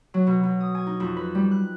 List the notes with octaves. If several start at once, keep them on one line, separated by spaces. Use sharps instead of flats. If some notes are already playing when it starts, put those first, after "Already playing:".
F#3
B2
B2
D#6
G#5
D#4
F2
B4
G3
F#6